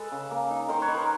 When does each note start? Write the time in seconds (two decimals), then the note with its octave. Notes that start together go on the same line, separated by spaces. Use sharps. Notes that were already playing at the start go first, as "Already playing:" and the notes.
Already playing: G#3 A4 B4
0.12 C#3
0.31 A#3
0.50 D#4
0.69 D#3 A#4 C5
0.82 B4 C#5
0.88 D#4
0.94 A#4 C5